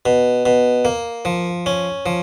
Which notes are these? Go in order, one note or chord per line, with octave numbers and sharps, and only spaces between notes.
B2
B2
A#3
F3
C#4
F3